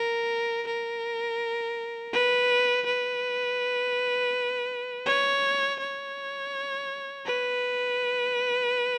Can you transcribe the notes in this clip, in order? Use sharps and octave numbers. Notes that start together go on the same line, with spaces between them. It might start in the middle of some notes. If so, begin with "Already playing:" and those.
Already playing: A#4
A#4
B4
B4
C#5
C#5
B4